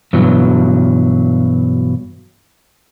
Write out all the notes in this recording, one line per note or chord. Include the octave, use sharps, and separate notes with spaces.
G2 B2 E3 F#3